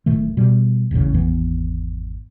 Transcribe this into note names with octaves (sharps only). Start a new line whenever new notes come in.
D1 A2 D#3 A3
B2 G3
D#1 A1 E2 C#3
G#1 E2 E3 B3